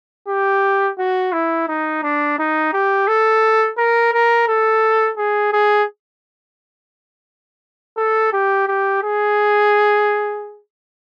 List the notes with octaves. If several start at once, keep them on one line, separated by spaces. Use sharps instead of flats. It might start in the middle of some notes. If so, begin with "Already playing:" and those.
G4
F#4
E4
D#4
D4
D#4
G4
A4
A#4
A#4
A4
G#4
G#4
A4
G4
G4
G#4